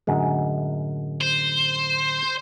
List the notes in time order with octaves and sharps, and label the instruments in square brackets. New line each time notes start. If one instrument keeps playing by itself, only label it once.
[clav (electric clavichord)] F#2 G#3 [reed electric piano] A2 D3
[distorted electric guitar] C5